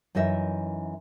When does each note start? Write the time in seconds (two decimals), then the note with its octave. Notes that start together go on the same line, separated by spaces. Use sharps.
0.15 F#2 E3 D#4 A#4 E5